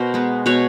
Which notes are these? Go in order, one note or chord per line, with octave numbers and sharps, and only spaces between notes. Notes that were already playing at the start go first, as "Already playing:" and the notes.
Already playing: B2 A#4 C5
G#3 B3
B2 B4 C#5